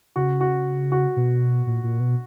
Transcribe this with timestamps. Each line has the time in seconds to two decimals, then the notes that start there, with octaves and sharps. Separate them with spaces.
0.16 C#3 F#4
0.41 F#4
0.92 F#4
1.16 B2
1.67 A#2
1.83 A#2
2.00 B2